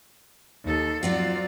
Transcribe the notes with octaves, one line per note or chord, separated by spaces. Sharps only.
D#2 A4
F#3 C4 F4 F#4 D5